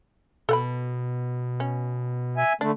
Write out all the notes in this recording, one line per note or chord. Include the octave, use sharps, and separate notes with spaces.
B2 A4 F#5 B5
C#4
E5 G#5
D3 A3 D4